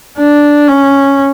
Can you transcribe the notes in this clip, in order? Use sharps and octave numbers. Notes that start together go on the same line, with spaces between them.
D4
C#4